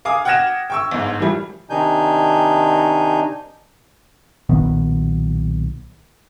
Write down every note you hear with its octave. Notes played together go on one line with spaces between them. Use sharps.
F5 G#5 D6 D#6
F#5 G5 F6 G#6 A#6 E7
G5 C#6 E6
G1 G#2
A2 E3 F3 G3
C3 D#3 D4 D#4 G#5 G6
B1 A#2 D#3 B3